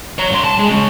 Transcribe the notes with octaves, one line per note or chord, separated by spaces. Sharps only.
C#5 A#5
G2 C6
A5
G#3
G#3 C#4